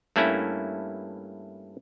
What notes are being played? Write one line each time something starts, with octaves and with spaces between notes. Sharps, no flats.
G2 A3 A#3 C#4 E4